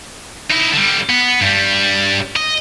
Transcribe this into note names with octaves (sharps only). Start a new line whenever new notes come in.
D#4 E4
D3 G3
B3
G2 G3
D#5